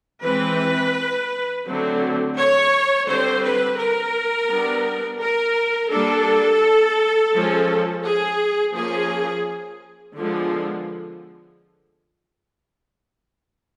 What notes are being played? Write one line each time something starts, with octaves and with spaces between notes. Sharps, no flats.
E3 G#3 C4 B4
D3 F#3 A3 C4
C#5
D3 G3 C4 C5
B4
A#4
G3 B3 D4
A#4
G3 A#3 D4 A4
F3 G#3 C#4
G#4
F3 A#3 C#4 G#4
D3 F3 G#3 B3